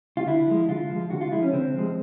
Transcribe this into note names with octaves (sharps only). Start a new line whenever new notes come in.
F4
D3 E4
F3 G#3
D3 F4
F3 G#3
D3 F#4
F4
F3 G#3 E4
C#4
D3 C4
F3 G#3